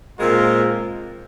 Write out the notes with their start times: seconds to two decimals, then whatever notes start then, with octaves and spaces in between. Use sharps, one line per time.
0.18 A#2 G#3 C4 F4 A#4